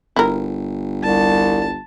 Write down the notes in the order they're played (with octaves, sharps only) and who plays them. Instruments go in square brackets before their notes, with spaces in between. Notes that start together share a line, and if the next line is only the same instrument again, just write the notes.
[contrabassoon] G1 [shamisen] E4 A#4
[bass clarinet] C2 [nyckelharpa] A5